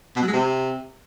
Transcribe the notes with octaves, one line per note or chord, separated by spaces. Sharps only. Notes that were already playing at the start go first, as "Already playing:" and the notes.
B2
F#3
G#3
C3